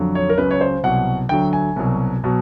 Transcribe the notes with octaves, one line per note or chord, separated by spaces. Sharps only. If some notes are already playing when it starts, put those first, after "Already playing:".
Already playing: F2 D3 F#3
C#5
A#4
C#2 C#3 F#3 B4
C#5
C5
C2 B2 F#3 F#5
D2 D3 F#3 G5
G#5
C2 B2 F#3
B2 F#3